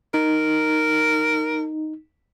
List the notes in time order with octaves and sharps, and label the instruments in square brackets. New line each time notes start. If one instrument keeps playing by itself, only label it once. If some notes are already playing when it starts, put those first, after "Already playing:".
[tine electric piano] D#4 [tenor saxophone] A#4